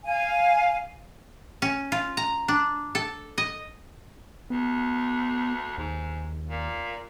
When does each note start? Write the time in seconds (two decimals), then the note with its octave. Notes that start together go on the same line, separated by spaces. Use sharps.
0.05 F5 G#5
1.62 C#4
1.92 F4
2.17 A#5
2.48 D4
2.95 A4
3.38 D#5
4.50 D2 B3
5.78 D#2 G#2
6.50 A#2